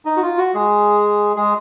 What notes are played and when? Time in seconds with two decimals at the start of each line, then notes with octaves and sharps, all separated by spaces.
0.05 D#4
0.17 F#4
0.22 F4
0.38 F#4
0.54 G#3 G#4
1.36 G#3 G#4